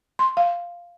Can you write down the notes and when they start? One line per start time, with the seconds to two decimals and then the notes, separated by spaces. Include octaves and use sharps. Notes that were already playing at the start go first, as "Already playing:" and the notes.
0.19 C6
0.37 F5